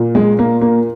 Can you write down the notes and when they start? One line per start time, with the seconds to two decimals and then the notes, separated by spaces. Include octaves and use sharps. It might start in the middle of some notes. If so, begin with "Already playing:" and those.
Already playing: A#2
0.15 G#3
0.39 A#3
0.61 A#3